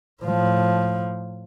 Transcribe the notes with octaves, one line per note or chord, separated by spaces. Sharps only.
A2 F3